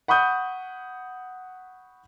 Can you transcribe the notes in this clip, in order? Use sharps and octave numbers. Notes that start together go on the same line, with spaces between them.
F#5 B5 C#6 D#6 G6